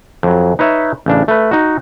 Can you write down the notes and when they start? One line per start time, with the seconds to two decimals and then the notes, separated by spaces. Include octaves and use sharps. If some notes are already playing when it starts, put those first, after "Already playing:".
0.23 F2 F#3
0.59 D#4 B4 C#5 E5
1.06 A1 C#3 D4
1.28 A3 B4
1.51 D#4 F#4